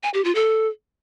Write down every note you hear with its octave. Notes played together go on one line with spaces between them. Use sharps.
G#5
G4
F4
A4